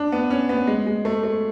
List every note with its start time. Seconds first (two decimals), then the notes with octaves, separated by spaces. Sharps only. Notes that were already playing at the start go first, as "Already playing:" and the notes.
Already playing: D4
0.12 B3
0.30 C#4
0.49 B3
0.67 G#3
0.87 G#3
1.05 A3
1.24 A3